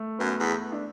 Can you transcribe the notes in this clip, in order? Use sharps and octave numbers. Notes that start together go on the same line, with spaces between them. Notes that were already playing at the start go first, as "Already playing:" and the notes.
Already playing: A3
F#2 B3
E2
D4